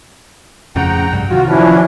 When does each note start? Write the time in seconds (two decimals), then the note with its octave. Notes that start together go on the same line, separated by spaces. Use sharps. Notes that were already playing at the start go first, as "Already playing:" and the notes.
0.76 F2 A2 C#3 F#5 G5 A#5
1.11 C2 G2
1.30 C3 D#3 F#3 F4 F#4
1.48 E3 F3 C#4 D4 E4